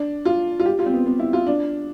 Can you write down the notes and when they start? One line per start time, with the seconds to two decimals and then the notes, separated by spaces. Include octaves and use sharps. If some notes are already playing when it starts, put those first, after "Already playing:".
Already playing: D4
0.25 F4
0.60 F4
0.66 G4
0.79 F4
0.86 C4
0.93 B3
1.06 B3
1.19 E4
1.33 F4
1.47 D4